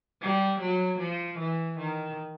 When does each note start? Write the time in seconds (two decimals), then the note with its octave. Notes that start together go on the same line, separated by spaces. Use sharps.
0.21 G3
0.60 F#3
0.99 F3
1.38 E3
1.78 D#3